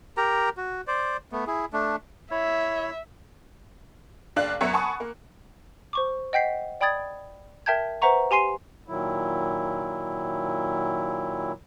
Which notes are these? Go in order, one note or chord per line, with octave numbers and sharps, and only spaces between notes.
G4 A#4 A#5
F#4
C5 D5
A3 B3
E4 G#4
A3 D4
E4 C#5 E5
F#1 D4 D5 F5 F#6 F#7
F#2 F#3 B3 C#5 E5 C#7
F#5 G#5 A5 B5 C#6 D#6
A#3
C5 C#6 D6
D#5 F#5 G5 G6 B6 C7
D5 G5 B5 D#6 G#6 A6
A#4 E5 G5 A5 G6 G#6
B4 C5 E5 F#5 A#5 C#6
G4 G#5 C6 C7 D#7
A#2 D#3 F#3 E4